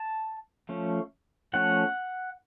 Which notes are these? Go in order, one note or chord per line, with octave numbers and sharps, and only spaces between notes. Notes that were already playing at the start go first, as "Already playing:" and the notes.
Already playing: A5
F3 A3 C#4
F3 A3 C#4 F#5